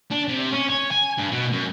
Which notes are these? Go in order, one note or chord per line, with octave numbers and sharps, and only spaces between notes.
D4
C3
C#4
C#5
G#5
G2
B2
F#2